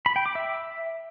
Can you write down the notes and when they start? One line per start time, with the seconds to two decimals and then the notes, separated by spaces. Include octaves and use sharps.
0.06 B5
0.16 G5
0.26 D6
0.35 E5